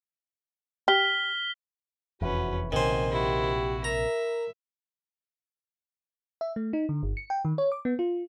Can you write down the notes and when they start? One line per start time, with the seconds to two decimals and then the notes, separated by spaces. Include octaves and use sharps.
0.88 G4 F6 B6 G7
2.22 F1 E2 C#4 F#4 B4
2.72 A#1 F#2 C3 D#3 C5 G#5
3.11 E4 F#4 G4
3.84 A#4 E5 A#5
6.41 E5
6.56 A3
6.73 D#4
6.89 D3
7.03 G1
7.17 C#7
7.30 G5
7.45 D#3
7.58 C#5
7.72 D6
7.85 B3
7.99 F4